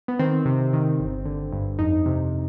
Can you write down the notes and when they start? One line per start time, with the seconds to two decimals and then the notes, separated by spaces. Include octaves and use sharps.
0.08 B3
0.19 D#3 C4
0.46 C3
0.73 D#3
1.00 G1
1.25 D3
1.52 G2
1.79 F2 D#4
2.06 C3